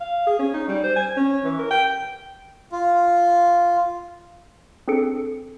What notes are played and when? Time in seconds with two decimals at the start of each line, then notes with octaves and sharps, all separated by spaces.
0.01 F5
0.27 G#4
0.39 C#4
0.54 D#4
0.68 G3
0.84 C5
0.96 G#5
1.17 C#4
1.45 E3
1.59 A#4
1.71 G5
2.72 F4
4.88 C4 D4 G#4 A4 C#7 D7